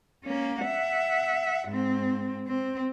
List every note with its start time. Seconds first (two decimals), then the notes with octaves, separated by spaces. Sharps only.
0.24 A#3 C#4
0.61 E5 F#5
1.68 G#2 C4
2.47 C4